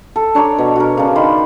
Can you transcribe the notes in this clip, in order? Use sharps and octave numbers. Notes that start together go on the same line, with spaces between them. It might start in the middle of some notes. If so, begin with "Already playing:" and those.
A4
D4 C#5 D5 A#5
B2
F#4 A#4
C#3 D4
D#3 B5 C6